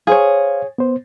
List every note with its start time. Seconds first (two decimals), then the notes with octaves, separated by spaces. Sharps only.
0.07 G#4 C5 C#5 F5
0.78 B3 C5